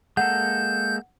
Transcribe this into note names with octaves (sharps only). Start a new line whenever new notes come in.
G#3 A#3 A4 F#5 G6